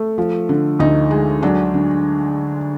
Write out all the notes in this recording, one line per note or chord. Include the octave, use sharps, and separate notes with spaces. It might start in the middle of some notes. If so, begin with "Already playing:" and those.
Already playing: A3
F3
D3
D2 D#4
G#3
F#3 D4
D3